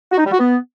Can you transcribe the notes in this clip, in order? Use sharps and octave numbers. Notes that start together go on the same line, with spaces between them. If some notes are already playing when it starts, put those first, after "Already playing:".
F#4
D#4
G3
F#4
B3